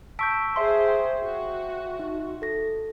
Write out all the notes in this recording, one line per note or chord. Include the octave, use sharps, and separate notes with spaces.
A5 C#6 E6 G6 B6 D7
G#4 C5 E5 C6
G5
F#4
D#4
A4 A#6